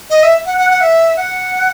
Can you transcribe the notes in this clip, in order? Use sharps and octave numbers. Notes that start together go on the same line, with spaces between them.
D#5
E5
F#5
F#5
F#5
E5
F#5